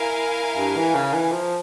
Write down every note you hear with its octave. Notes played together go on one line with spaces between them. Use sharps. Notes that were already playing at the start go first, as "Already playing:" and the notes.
Already playing: E4 A#4 F5 G#5
G2
E3
C#3
E3
F3